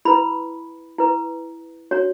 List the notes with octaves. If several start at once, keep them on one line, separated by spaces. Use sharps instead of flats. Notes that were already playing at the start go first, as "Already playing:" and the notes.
E4 B4 B5
E4 B4
D4 F#4 C#5